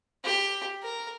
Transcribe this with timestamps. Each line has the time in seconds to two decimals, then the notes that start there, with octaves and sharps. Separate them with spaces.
0.24 G4
0.82 A#4